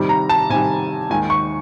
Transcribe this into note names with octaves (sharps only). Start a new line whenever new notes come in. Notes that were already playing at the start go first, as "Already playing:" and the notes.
Already playing: C3 D#3 G3
A#5
A5
C3 D#3 G3 G#5
D#2 D#3 G#3 G#5
C#6